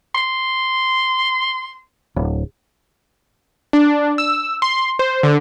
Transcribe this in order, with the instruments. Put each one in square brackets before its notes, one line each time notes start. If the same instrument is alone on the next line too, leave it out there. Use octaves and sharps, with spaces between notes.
[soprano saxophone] C6
[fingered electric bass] D1
[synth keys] D4
E6
C6
C5
D3